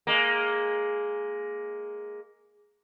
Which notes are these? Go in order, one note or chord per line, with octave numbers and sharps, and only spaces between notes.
G#3 A#3